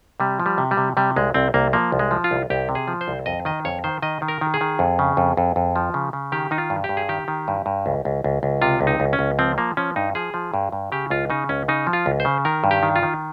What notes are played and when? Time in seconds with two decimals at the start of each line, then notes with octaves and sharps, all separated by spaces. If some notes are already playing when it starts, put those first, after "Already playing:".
0.20 C3 G3
0.40 F3
0.46 G3
0.58 C3
0.71 G3
0.77 C3
0.97 C3 G3
1.16 C2 G#3
1.34 C2 C4
1.54 C2 A#3
1.73 F3 A#3
1.92 C2
1.99 G#3
2.11 F3
2.24 F4
2.31 C2
2.50 C2 G4
2.69 C3
2.75 G#4
2.88 F3
3.01 C5
3.08 C2
3.26 F2 D#5
3.45 D#3 D#5
3.65 F2 C#5
3.84 D#3 C5
4.02 D#3 D#5
4.22 D#3
4.28 A#4
4.41 D#3
4.54 G#4
4.61 D#3
4.79 F2
4.99 C#3
5.17 F2
5.37 F2
5.56 F2
5.76 F3
5.94 C#3
6.13 C#3
6.32 D#3 G4
6.51 D#3 D#4
6.58 F4
6.70 G2
6.84 G4
6.89 G2
6.97 G#4
7.09 D#3 G4
7.28 D#3
7.48 G2
7.66 G2
7.86 C#2
8.05 C#2
8.24 C#2
8.43 C#2
8.62 C3 F4
8.81 C#2
8.87 D#4
9.00 C#2
9.13 C#4
9.19 C#2
9.39 F3 C4
9.58 F3 A#3
9.77 F3 C#4
9.96 G2 D#4
10.15 F3 G#4
10.34 F3
10.54 G2
10.72 G2
10.92 C#3 G4
11.10 C#2 F4
11.30 C#3 D#4
11.49 C#2 C#4
11.68 C#3 D#4
11.87 F3
11.93 F4
12.06 C#2
12.20 C5
12.25 C#3
12.45 D#3 A#4
12.64 G2
12.71 G4
12.83 D#3
12.96 F4
13.03 D#3